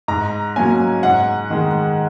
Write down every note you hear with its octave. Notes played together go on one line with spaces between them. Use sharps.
G#2 A#5
F#3 A#3 C#4 G#5
G#2 F#5
D#3 G#3